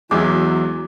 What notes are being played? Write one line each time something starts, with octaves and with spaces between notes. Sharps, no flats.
E2 F#3 G#3 E4 D6